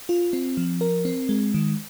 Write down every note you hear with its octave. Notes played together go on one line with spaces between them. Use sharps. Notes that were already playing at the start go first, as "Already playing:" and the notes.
F4
C4
F3
A#4
C4
G#3
D#3